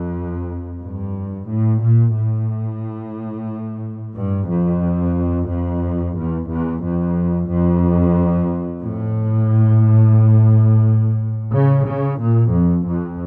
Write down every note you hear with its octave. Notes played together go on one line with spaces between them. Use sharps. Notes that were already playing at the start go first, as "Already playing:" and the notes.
Already playing: F2
G2
A2
A#2
A2
G2
F2
F2
E2
E2
F2
F2
A2
C#3
C#3
A#2
F2
F2